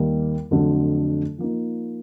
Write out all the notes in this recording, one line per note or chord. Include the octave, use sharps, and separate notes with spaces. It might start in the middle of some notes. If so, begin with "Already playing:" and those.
Already playing: D#2 D#3 G3 A#3
F2 D3 F#3 A3
F3 A#3 D#4